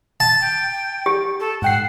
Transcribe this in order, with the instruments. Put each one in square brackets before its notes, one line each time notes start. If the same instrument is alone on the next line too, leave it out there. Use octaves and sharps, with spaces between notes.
[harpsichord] A5
[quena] G5
[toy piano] G4
[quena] A4
[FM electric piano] G#2 G5 C7 [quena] F#5